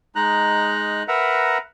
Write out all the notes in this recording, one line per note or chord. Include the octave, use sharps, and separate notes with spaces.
G#3 D#4 A#5 F#6
A#4 B4 E5 F#5 A#5